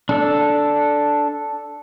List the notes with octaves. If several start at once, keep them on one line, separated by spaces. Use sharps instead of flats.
D4 A4 E6